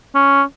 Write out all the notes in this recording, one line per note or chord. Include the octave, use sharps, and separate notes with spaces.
C#4